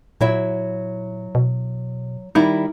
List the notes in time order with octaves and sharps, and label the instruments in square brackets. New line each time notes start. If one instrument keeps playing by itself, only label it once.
[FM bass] A#2 [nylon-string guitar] F#3 E4 E5
[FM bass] B2
[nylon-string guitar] D#3 G3 E4 [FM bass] D#4